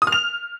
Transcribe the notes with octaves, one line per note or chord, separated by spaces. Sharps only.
D#6
F6
F7